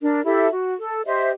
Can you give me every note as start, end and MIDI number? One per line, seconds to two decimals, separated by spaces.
0.02 0.23 62
0.02 0.23 70
0.02 0.23 74
0.25 0.48 64
0.25 0.48 67
0.25 0.48 69
0.25 0.48 76
0.52 0.75 66
0.79 1.01 69
1.06 1.30 67
1.06 1.30 72
1.06 1.30 75
1.06 1.30 76